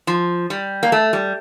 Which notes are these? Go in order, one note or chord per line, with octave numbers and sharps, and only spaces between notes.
F3
G3
A#3
A3
G3